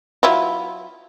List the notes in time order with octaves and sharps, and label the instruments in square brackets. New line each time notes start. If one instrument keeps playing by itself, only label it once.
[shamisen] F#3 E4 F4